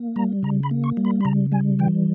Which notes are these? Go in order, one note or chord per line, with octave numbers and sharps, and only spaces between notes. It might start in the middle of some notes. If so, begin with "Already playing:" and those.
Already playing: A#3
G3 A#5
C#3 A#5
B5
A#3
C#6
G3
B5
B5
C#3 A#5
G3 G#5
E3 G5